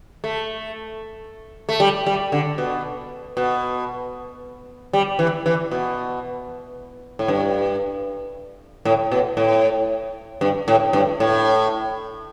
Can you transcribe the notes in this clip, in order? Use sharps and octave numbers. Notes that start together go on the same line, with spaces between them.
A3
A3
G3
G3
D3
B2
B2
G3
E3
E3
B2
A2
G2
A2
B2
A2
G2
A2
G2
A2